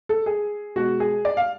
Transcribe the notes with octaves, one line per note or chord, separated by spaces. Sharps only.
A4
G#4
B2 G#3 F#4
G#4
D5
F5